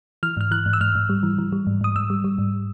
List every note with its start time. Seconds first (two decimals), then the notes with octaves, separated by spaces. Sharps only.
0.23 E3 F6
0.37 G#2 F6
0.51 E3 F#6
0.66 G#2
0.73 E6
0.81 G#2 F6
0.95 G#2
1.09 G3
1.23 E3
1.38 E3
1.52 G3
1.67 G#2
1.81 G#2 D#6
1.96 G#2 E6
2.10 G3
2.24 G3
2.38 G#2